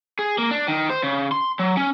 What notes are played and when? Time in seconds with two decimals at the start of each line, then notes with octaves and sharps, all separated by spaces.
0.19 G#4
0.38 A#3
0.51 D4
0.68 D#3
0.90 C5
1.03 C#3
1.32 C6
1.59 F#3
1.77 C#4